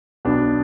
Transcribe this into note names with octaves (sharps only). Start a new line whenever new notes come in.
B1 B3 D4